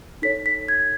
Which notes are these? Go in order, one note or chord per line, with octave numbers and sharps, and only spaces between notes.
D#4 A4 C#5 B6
B6
G#6